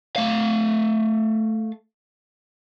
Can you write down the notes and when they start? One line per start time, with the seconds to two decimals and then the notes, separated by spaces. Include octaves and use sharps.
0.16 A3 F5